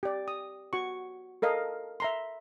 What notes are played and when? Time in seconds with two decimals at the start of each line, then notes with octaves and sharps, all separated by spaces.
0.03 G4 D5
0.28 D#6
0.73 F#4 C#6
1.42 A4 A#4 D#5 F5
2.00 E5 A#5 C6